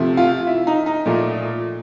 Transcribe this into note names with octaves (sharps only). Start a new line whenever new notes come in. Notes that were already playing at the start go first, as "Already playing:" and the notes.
Already playing: C3 F3 A3
F4
E4
D#4
D#4
A#2 F3 A3